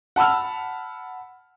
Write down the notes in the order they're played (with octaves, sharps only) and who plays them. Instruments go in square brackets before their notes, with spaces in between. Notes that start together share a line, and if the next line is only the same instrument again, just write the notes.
[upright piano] F#5 A5 B5 E6 F6